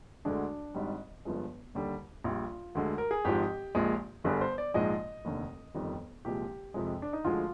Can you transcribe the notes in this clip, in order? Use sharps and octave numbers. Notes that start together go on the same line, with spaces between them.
D2 D3 G#3 D4
G#1 G#2 G3
G1 G2 F3 G#3
D#2 D3 G3
A#1 A#2 G3 F4
D2 D3 G#3
A#4
G#4
G#1 G#2 F3 G#3 G4
A#1 A#2 F3 G#3
G1 G2 D3 G3 G#4
C5
D5
A#1 G#2 F3 G#3 D#5
F1 D#2 D3
G1 F2 D#3 G3
C2 A#2 F3 G#3 G4
F2 C3 F3 G#3
D4
D#4
D2 D3 F3 G#3 F4